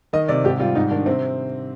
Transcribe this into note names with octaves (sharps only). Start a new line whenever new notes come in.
D#3 D#5
C3 D5
G#2 G4
G3 F4
G#2 D#4
D#3 D4
C3 C4